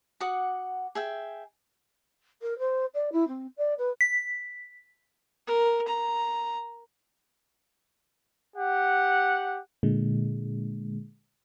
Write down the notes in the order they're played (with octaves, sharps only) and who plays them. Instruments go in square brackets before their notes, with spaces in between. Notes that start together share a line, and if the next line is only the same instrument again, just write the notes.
[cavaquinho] F#4 F#5 D6 D#6
G#4 E5 G5
[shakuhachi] A#4
C5
D5
E4
C4
D5
B4
[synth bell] B6
[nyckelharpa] A#4
A#5
[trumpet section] G4 F#5
[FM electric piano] A#2 D3 G#3